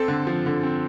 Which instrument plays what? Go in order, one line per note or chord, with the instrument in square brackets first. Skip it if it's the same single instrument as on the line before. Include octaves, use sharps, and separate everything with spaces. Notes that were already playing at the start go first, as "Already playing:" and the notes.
Already playing: [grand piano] C4 A4
D3
F3
D3
C4